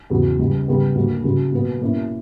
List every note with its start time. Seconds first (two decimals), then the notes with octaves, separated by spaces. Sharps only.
0.10 E2 C#3 F#3
0.39 C#2 C#3 G3
0.68 C#3 G3 B3
0.95 D2 D3 F#3 A#3
1.24 F#2 C#3 F#3
1.52 A#2 F#3 B3
1.81 B2 A#3 C#4 E4